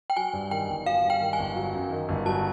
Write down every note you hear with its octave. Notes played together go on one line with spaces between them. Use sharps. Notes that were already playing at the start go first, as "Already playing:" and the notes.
G5
F#3 G#5
G2
D#3 G5
G1
F#3 F5
G2
G5
D#3
G#5
G1
F#3
F#2
D#3
G1
F#3 A5